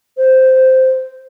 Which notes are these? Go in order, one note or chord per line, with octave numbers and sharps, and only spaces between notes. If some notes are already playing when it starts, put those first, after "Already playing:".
C5